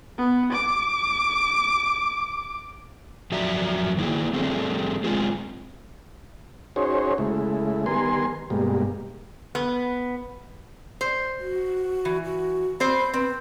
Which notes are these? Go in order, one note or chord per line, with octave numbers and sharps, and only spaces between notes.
B3
D6
F2 F#3 F#4 D5 E5 A#5
D#3 A#3 E4 G#4
G3 A3 C4 G#4
G#3 C4 F4 G#4
C#4 D#4 F#4 G#4 C5 C#5
C#3 G#3 A3 E4
D#3 G3 B3 A#4 G#5 C6
G2 B2 G3 G#3 A#3
B3
C5
F#4
E3
F#4
C4 C5 B5
C4 B4